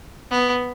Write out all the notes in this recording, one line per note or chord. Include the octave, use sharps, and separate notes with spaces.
B3